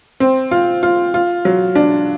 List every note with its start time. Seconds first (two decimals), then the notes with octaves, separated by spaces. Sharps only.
0.20 C4
0.51 F4
0.83 F4
1.14 F4
1.45 F#3
1.75 D4